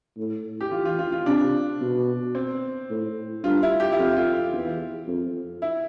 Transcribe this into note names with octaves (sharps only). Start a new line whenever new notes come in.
A2
G4
E3 F4
F4
F4
F4
C3 D4
B2
C4
A2
G2 F4
E4
G4
E4
F2 F4
F4
E2
F2
E4